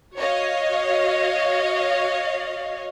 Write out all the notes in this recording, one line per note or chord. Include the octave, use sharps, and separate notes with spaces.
F#4 C#5 D#5 F5